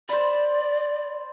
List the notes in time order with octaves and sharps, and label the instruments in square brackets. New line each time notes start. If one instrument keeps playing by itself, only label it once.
[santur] C5 B5 [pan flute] D5